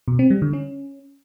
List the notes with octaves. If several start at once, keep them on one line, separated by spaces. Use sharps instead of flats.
B2
C4
G3
D3
C#4